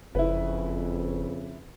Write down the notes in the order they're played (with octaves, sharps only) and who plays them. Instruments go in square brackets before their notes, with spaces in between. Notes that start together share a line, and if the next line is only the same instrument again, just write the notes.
[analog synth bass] F#1 [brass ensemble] F2 C#3 [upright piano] E4 B4